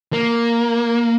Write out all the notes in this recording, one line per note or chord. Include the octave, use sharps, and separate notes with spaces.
A#3